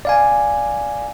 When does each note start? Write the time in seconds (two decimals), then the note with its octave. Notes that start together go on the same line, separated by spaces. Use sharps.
0.05 D5 F5 G#5